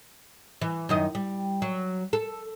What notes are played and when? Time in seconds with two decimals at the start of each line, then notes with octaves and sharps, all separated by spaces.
0.61 E3
0.89 F#2 D#3 D#5
1.15 G3
1.62 F#3
2.13 A4